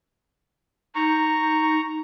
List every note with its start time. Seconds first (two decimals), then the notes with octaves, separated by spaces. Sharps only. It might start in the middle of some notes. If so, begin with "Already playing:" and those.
0.95 D#4 A#5 C#6